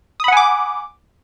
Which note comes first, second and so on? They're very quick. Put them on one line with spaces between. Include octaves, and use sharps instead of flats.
D#6 B5 F#5 G#5 D6